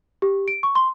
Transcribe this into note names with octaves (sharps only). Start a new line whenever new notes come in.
G4
D7
C#6
C6